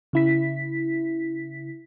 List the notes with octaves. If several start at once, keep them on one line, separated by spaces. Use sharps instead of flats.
C#3 E4 B6